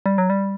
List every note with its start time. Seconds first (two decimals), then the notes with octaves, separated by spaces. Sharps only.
0.06 G3
0.18 F#3
0.30 G3